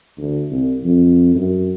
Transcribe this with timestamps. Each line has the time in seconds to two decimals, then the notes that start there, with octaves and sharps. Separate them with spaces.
0.17 D2
0.51 C2
0.84 F2
1.35 F#2